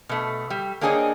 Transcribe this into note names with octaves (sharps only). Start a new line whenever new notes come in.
B2 A3
G3
A#3 C4 D4 G#4 C#5 D#5